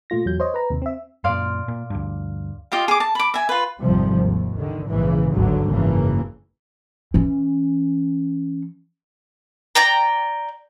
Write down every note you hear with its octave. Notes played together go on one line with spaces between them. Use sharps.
A#2 A3 F4 A#6
E2 F#3 G6
C5 C#5 D#5
B4 A#5
D#2 C3
C4 E5
F#2 A#2 D5 F5 C6
A#2
D2 G2
F4 G4 D#5 F5
G#4 D6
A5
B5 D6
E5 G#5
F4 B4
G#1 F2 C3 F3 G3
D#2
D3 D#3
A#1 G#2 C#3 E3
G#1 D2 G2 D3 F#3
G#1 F#2 C#3 E3 A#3
E3 C#4
D5 G5 A#5